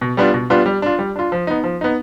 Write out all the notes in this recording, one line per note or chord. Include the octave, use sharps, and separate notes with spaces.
B2
G3 B3 D4 F4
B2
G3 B3 D4 F4
G3
D4 F4
G3
D4 F4
F3
B3 D#4
F3
B3 D#4